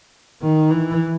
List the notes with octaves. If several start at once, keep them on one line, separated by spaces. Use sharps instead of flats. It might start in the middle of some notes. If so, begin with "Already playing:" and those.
D#3
E3